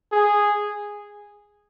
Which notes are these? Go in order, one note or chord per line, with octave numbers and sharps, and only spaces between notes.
G#4